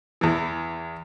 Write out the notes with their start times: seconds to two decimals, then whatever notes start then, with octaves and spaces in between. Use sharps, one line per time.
0.21 E2 E3